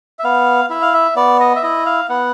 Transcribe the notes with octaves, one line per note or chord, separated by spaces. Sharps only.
E5
B3 F5
E4 E5
F5
E5
B3 D5
D#5
E5
E4 D#5
F5
B3 F#5